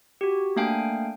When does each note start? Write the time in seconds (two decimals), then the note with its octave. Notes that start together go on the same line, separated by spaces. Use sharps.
0.21 F#4 G4
0.56 A3 A#3 D4 F5 G5 G#5